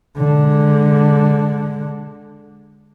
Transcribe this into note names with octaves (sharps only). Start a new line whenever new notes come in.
D3 G#3